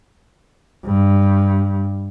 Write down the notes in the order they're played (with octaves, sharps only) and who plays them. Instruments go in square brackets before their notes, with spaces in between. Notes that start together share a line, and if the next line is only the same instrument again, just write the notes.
[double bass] G2